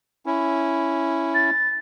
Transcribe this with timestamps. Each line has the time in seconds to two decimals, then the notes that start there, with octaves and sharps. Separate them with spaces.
0.26 C#4 E4
1.35 A6